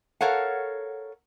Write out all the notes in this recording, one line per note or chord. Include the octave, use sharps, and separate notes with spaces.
A4 A#4 C#5 F5 F#5